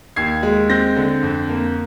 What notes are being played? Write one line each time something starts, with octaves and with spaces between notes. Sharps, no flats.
D#2 G#6 C7
G#3
C4 G6 A#6
D3
F2
A#3